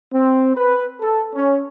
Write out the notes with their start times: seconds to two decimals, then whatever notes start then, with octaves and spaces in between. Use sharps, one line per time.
0.12 C4
0.55 B4
1.01 A4
1.35 C#4